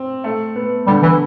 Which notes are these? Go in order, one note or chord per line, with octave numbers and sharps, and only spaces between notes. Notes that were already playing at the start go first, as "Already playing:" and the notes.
Already playing: C4
A3
B3
D3 G3
E3